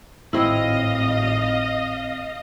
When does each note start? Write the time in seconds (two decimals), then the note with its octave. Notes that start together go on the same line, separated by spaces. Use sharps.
0.33 G#1 A2 C4 E4 D#5 F5